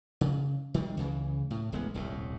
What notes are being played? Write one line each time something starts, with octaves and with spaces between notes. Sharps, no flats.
C#3
D#3 G3 G#3
C#2 C#3 E3
A2
D1 A1 G#3 B3
D#1 C2 A2